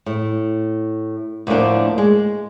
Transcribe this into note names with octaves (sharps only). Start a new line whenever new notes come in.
A2
D2 A2 D3 F3 A#3 D4
G#3